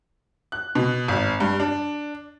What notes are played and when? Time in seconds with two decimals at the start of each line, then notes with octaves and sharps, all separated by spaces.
0.52 F#6
0.75 B2
1.08 G#1
1.40 G2
1.60 D4